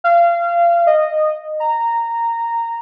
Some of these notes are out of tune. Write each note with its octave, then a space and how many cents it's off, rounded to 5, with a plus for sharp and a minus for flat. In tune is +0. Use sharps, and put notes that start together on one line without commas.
F5 -25
D#5 -15
A#5 -10